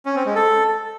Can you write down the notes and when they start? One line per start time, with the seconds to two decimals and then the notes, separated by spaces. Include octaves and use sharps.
0.06 C#4
0.16 C4
0.25 G#3
0.35 A4